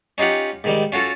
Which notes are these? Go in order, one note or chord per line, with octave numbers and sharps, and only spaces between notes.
C#4 D#4 F4 G4 F#5
G#2 D#3 G3
C#4 F4 F#4 A4